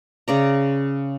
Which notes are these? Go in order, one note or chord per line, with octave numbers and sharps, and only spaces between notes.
C#3 D5 A#5